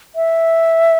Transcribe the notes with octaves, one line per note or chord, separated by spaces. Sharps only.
E5